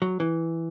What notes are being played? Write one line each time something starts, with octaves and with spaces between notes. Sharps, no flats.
F#3
E3